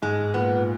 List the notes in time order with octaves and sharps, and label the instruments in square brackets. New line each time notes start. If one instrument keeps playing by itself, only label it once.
[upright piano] G#2 [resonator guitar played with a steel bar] G#3
[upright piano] A#2 [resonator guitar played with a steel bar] B3